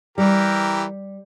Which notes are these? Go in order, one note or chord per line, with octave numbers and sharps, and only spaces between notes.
E3 G3 G4 A#4